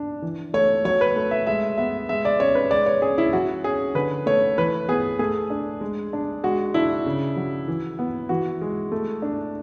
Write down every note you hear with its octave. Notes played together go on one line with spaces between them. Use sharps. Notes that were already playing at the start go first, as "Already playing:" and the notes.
Already playing: D4
E3
A3 C#5
F#3 C#5
B4
A3
E5
G#3 E5
B3 E5
G#3 E5
D5
C#4 C#5
B4
G#3 D5
C#5
C#4 G#4
E4
F#3 F#4
C#4 G#4
D3 B4
A3 C#5
E3 B4
B3 G#4
A3 G#4
D4
G#3
D4
G#3 F#4
D4 E4
C#3
F#3
E3
B3
E3 F#4
G#3
A3
D4